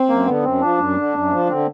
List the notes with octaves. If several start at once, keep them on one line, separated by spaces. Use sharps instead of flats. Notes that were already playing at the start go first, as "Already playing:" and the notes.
Already playing: C4
F#2 A#3
D3 B3
F#2 C4
F3 D4
F#2
D3
F#2
F3
D3 C4